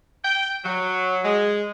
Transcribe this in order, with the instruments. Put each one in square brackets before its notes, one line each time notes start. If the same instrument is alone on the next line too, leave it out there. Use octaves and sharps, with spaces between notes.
[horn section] G5
F#3
G#3